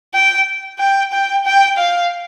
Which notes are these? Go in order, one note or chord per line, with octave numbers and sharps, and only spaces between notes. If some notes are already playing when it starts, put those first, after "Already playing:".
G5
G5
G5
G5
F5